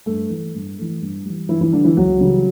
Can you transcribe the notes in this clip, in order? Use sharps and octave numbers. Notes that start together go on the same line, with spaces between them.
G2 A3
E3 A3
G2
E3 A3
G2
E3 G3
G2 E3 E4
E3 E4
D3 E3 G3 D4
E3 E4
C#2 F#3 F#4
C#3 E3 G3